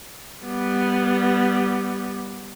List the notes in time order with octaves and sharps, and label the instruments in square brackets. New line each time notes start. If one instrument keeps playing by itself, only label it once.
[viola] G3 B3